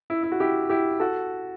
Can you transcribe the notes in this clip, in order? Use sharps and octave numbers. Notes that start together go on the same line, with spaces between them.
E4
E4
F#4
E4 G4
E4 G4
F#4 A4